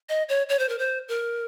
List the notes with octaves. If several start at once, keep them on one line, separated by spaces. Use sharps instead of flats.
D#5
C#5
C#5
C5
A#4
C5
A#4